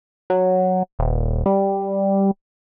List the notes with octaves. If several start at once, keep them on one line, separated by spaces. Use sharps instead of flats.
F#3
D#1
G3